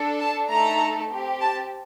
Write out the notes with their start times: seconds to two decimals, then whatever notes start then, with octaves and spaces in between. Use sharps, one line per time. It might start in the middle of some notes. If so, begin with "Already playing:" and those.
Already playing: D4 A4
0.19 A5
0.49 A3 D#4 A4 A#5
1.11 C4 G4
1.41 A5